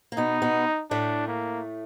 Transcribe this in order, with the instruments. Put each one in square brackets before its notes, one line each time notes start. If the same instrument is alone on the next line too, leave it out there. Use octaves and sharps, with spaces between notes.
[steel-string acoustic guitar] A#3
[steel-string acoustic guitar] B2 B3 [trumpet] D#4
[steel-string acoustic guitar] B2 B3
[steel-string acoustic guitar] A2 A3 [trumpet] D4
[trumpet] A#3